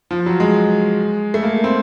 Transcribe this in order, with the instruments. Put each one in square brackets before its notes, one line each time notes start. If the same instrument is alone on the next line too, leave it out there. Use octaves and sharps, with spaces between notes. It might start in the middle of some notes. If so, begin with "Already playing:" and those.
[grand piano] F3
F#3
G#3
A3
A#3
C4